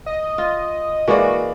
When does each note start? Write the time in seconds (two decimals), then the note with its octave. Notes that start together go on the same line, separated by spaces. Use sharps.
0.06 D#5
0.38 F4
1.08 E3 G#3 A#3 F#4 D5